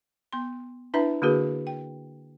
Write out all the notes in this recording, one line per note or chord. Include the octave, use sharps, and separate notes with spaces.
B3 C6
D4 E4 B4 E5 A#5
D3 A#3 D4 F#4 G#4 B4
G5